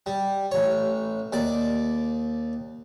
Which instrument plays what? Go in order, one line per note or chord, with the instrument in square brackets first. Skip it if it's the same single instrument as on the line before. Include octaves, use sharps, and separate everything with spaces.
[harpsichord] G3
A1 C#5
D#2 D5 D6